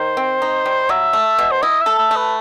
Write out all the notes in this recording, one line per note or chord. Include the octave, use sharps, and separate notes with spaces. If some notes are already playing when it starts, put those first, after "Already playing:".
Already playing: D#3 C5
C4
D#4
G3
F#3 E5
A3
B2
C5
E4 D#5
E5
A4
E5
A3
B4